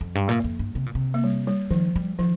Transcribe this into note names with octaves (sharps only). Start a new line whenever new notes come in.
F2
G2
A#2 A#3
F2
G2
C3
A#2
C3
A#3
G3
G3
D#3 F3
G3
D#3 F3